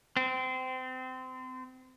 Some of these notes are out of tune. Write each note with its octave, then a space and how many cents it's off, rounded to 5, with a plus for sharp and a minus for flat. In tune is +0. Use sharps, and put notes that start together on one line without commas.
C4 -25